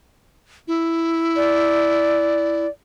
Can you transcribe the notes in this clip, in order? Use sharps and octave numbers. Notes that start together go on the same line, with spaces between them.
E4
D5